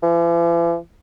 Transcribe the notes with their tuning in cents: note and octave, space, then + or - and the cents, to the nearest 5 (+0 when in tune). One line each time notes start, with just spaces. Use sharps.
E3 +45